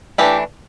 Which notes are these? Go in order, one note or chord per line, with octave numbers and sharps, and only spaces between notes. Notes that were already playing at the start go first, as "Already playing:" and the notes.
E3 A3 D4 E4 G4